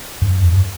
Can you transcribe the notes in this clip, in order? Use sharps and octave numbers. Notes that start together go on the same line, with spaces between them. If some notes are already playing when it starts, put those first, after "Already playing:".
F#2
F2
F#2